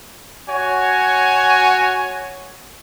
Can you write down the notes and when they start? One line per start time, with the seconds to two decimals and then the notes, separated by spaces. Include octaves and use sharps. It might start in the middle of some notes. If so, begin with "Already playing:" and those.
0.47 F#4 C#5 G#5